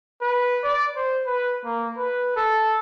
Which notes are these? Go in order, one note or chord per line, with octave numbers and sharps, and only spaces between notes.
B4
D5
C5
B4
A#3
B4
A4